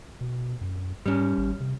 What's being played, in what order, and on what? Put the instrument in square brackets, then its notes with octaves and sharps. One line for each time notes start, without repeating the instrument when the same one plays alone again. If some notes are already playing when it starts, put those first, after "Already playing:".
[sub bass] B2
F#2
[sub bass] G#2 [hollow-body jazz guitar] G3 C#4
[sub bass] G#1
C3